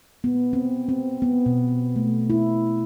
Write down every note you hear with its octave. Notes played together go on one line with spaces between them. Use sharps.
B3
C4
C4
B3
B2
A3
E4